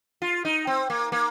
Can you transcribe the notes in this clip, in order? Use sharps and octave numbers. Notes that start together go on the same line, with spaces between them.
F4
D#4
C4
A#3
A#3